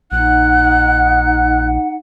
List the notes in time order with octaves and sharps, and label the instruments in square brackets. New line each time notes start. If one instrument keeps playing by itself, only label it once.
[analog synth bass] A#1 [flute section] D#4 F#5 [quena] F#6